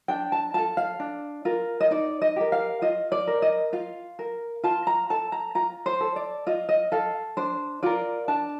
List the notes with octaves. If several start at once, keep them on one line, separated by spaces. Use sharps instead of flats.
D4 G5
A5
F4 A4 A5
F5
D4
F4 A#4
D#5
D#4 D5
D#5
G4 A#4
F5
F4 D#5
D5
A#4
D#5
F4 F5
A#4
F4 A5
A#5
A4 A5
A#5
F4 A#5
C5
A4
D5
F4 D#5
D#5
A4 F5
D4 C5
F4 A#4 D5
D4 A5